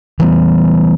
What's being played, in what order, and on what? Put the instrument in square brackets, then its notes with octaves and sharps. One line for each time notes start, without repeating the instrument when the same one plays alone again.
[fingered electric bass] E3 G3 B3